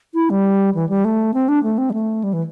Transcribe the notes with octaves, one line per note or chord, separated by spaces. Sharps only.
E4
G3
E3
G3
A3
C4
D4
A3
C4
G3
A3
G3
E3